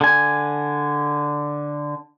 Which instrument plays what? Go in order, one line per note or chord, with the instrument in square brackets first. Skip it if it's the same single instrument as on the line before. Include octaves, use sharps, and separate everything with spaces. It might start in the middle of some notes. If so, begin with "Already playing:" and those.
[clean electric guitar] D3 G#5